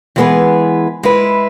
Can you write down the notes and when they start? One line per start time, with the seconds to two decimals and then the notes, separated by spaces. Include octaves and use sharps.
0.16 E3 G#3 B3 G#4 B4
1.03 G#3 E4 B4